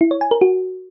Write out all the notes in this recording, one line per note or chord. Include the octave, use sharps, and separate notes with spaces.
E4
C#5
G#5
A#4
F#4